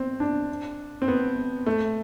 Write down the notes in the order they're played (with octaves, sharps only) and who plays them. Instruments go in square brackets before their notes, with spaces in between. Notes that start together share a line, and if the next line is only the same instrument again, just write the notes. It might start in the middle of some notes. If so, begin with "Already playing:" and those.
Already playing: [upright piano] C4
D4
C4
B3
A3